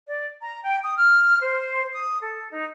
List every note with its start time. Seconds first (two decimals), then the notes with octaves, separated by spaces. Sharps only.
0.07 D5
0.41 A#5
0.64 G5
0.83 D#6
0.97 F6
1.41 C5
1.92 D#6
2.23 A4
2.53 D#4